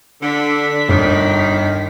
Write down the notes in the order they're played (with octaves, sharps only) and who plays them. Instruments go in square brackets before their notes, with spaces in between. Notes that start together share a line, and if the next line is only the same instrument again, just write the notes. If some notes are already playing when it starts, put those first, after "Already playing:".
[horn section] D3 [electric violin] D4 B6
[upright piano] G1 [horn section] D#3